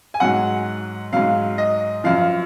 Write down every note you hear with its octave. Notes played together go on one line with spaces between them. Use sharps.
G#5
G#2 F#3 F#5
G#2 F#3 F5
D#5
F#2 F3 F5